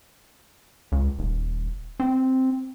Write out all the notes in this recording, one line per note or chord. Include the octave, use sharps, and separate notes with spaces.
C#2
D#1
C4